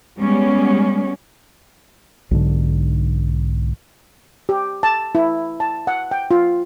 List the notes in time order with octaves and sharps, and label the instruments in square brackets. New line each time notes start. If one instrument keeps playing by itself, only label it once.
[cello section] G3 G#3 B3 C#4
[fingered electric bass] B1 G#2 D3
[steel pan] G4
A5
E4
A5
F#5
G5
F4